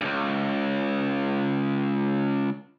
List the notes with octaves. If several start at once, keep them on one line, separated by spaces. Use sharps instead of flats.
C#2 G2